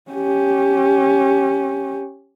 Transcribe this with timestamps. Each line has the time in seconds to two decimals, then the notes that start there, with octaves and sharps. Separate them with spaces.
0.11 C#4 G4